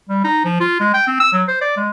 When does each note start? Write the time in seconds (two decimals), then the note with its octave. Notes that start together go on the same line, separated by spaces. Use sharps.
0.09 G3
0.24 D#4
0.45 F3
0.60 F4
0.80 G#3
0.94 G5
1.07 C4
1.20 E6
1.33 F#3
1.48 C5
1.61 D5
1.77 G#3